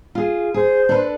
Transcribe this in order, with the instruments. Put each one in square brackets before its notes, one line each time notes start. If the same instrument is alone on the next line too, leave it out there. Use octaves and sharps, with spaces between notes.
[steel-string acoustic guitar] F4 G#4
[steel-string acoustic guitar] G#4 [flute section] C5
[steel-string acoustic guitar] D4 A4 B4